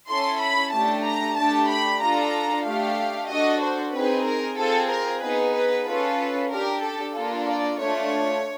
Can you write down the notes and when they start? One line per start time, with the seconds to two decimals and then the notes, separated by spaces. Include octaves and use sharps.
0.08 C#4 E4 A4 C6
0.41 B5
0.72 A3 D4 G4 A5
1.05 A#5
1.37 A3 D4 G4 A5
1.70 B5
2.01 D4 F4 A4 A#5
2.65 A3 D4 G4 F5
3.29 D4 F#4 A4 D#5
3.61 C5
3.93 C4 D#4 G#4 B4
4.25 A#4
4.58 C4 F4 G#4 A4
4.91 A#4
5.22 B3 D#4 G#4 B4
5.54 B4
5.86 C#4 F4 A4 B4
6.50 D4 G4 A#4
6.82 A4
7.15 A#3 D4 F4 A4
7.46 D5
7.79 A3 D4 F4 C#5